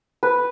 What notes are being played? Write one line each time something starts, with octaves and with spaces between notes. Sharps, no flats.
B4